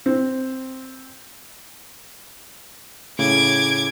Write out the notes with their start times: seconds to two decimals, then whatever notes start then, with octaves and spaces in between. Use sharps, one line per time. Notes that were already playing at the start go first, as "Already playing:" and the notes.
0.06 C4
3.19 A2 C#3 D6 G#6